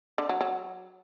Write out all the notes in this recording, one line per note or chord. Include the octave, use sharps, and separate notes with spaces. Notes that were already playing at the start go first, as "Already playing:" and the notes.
D3
F#3
F#3